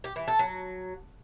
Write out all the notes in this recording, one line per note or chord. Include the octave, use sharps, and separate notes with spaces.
G4
E3
A4
F#3